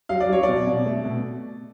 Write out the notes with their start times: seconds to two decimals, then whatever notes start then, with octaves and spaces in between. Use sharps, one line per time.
0.09 F#3 F5
0.20 D5
0.29 F#3 C#5
0.43 D5
0.48 B2
0.67 B2
0.86 A3
1.05 B2